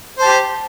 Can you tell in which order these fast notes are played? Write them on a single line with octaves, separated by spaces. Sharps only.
C5 A5 G4